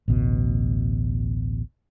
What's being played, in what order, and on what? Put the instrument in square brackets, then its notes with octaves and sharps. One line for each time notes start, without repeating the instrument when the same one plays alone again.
[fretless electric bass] A1 D2 B2